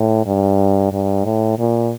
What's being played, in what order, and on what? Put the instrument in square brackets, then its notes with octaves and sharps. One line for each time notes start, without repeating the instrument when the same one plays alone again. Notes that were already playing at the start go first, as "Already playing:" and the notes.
Already playing: [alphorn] A2
G2
G2
A2
A#2